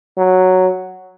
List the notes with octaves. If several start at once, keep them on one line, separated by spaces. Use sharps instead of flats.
F#3